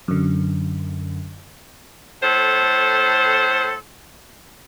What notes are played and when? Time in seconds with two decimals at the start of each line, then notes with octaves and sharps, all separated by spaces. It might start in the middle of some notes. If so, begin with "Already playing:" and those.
0.08 F#2 D3
2.22 A2 A4 C5